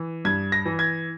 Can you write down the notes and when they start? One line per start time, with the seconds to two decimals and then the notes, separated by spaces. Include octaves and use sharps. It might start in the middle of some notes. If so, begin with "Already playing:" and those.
Already playing: E3
0.25 G2 G#6
0.52 A#6
0.66 E3
0.79 G#6